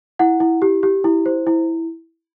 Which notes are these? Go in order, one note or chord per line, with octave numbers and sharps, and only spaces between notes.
E4 F#5
E4
G4
G4
E4
C5
E4